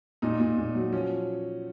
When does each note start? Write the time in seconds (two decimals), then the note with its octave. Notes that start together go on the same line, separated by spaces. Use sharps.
0.22 A#2 D#4
0.40 A#2
0.58 A#2
0.75 F#3
0.92 F3 C#4